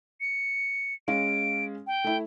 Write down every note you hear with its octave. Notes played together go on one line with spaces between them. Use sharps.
C#7
G#3 C#4 F5 D7
G5
A3 E4